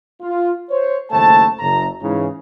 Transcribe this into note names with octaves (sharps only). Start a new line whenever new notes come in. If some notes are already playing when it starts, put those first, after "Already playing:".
F4
C5 C#5
F#1 D#2 A3 E4 C5 A5
F#1 F#2 A#5
G#2 C#3 E3